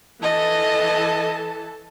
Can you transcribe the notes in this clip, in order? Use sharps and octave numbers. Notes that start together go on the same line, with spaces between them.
E3 A4 D#5 A5